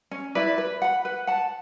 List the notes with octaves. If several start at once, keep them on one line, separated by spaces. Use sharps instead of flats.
C#4
E4 B4 D5
B4
F#5 B5
B4
F#5 A5